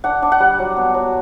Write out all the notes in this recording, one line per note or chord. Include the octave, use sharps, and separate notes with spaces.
D4 F#5
D4
F#5
G3
F#3
B3
F#3